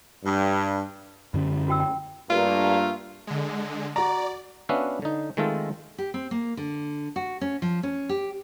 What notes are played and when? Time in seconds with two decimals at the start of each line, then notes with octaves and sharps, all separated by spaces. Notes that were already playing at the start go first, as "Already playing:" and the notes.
0.24 G2
1.34 F#2 D3 C#4
1.68 F#4 G5 E6
1.80 G5
2.30 G2 A3 A#3 F4
3.27 D3 G#3
3.96 F#4 D5 A#5
4.69 B3 C#4 D4 F#4 E5 F5
5.02 D3 D#4
5.37 D#3 G#3 A3 C4 F4 A4
5.98 G4
6.14 C4
6.31 A#3
6.57 D3
7.16 F#4
7.41 C#4
7.62 F3
7.83 C#4
8.09 G4